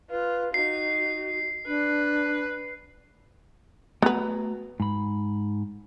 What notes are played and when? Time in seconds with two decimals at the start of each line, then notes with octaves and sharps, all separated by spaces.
0.10 F4 B4
0.54 D#4 F#4 C7
1.67 D4 B4
4.02 A3 B3 F#4 B4 A#5
4.80 G#2 B5